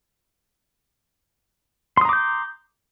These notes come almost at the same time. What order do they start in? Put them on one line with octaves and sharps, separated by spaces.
C6 D#6 A#5 D6 G6